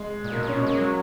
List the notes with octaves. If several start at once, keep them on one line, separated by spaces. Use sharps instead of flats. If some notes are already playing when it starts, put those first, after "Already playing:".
Already playing: G#3
A#2
B2 A#3
A#2 C#4
B2
G#3 A#3
F#3 A#3